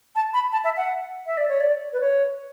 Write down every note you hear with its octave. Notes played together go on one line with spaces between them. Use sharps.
A5
B5
A5
E5
F#5
E5
D5
C#5
D5
B4
C#5